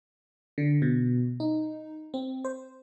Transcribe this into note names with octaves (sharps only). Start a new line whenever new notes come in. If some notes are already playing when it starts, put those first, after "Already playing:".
D3
B2
D#4
C4
C5